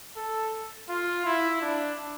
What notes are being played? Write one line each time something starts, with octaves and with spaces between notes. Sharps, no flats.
A4
F4
E4
D4